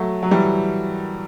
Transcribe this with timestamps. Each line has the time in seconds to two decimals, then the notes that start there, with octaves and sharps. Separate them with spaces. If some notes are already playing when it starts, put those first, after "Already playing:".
Already playing: F#3 A3
0.22 F#3
0.31 E3 G3